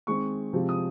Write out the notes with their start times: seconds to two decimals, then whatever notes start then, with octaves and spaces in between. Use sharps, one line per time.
0.07 D#3 G#3 C4 C#6
0.53 C3 F3 G#3 C4
0.69 D#6